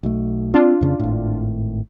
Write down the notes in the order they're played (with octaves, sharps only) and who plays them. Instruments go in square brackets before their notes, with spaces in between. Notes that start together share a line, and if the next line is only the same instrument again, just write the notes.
[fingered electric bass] B1 B2 A3
[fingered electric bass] C4 [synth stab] D4 F4
[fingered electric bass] F2 C#3 C#4
G#1 A2